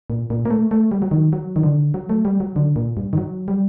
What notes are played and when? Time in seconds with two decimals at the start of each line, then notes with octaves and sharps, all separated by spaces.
0.10 A#2
0.30 A#2
0.45 A#3
0.50 A3
0.71 A3
0.91 G3
1.02 F#3
1.11 D#3
1.33 F#3
1.56 D#3
1.63 D3
1.94 F#3
2.09 A3
2.25 G3
2.40 F#3
2.56 D3
2.76 A#2
2.97 G2
3.13 D#3
3.18 F#3
3.48 G3